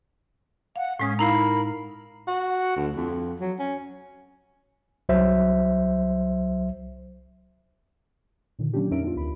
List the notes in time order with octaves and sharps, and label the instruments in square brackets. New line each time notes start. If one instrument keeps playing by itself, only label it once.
[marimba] F5 [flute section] F#5
[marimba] A2 G#3 D#6 [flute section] C#4
[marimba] D#4 E4 F5 [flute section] A#4 B5 [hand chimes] A#5 C7
[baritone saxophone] F#4
D2
F2
F#3
C#4
[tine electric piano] C2 F#3 C5 E5
[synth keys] A#2 D3 D#3 F3
F#3 A#3 C#4 D4 G4
F2 C#4 D#4 A#4 E5 D7
B3 D4 F4
D2 B5